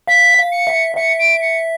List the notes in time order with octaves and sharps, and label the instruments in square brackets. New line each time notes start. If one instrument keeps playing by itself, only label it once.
[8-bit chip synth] F5 [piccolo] B6
[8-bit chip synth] F5
[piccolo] C#7
[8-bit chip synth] E5
[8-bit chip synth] E5 [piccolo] C#7
[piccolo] D7
C#7